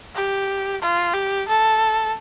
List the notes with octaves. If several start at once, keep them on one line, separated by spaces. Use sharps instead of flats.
G4
F4
G4
A4